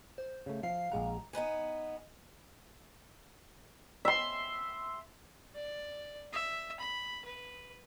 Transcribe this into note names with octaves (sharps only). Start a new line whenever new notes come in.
C5
C#3 A3
F3 F5 C7
A#1 G#3 F#5 A#5
B3 D#4 B4 G#5
E5 C6
D5
E5
B5
B4